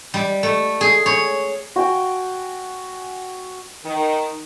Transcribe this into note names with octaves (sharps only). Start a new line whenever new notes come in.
G3
A3
G#4
C#5
F#4 G5 G#5
D#3